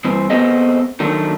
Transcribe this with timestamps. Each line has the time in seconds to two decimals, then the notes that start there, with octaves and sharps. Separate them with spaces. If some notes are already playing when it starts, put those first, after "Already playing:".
0.05 G2 E3 C4
0.30 A3 B3 C4 G#4 D#5
1.00 D#3 F#3 A3 D4 D#4